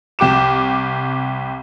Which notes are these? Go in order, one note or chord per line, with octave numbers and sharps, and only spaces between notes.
C2 G4 D6 E7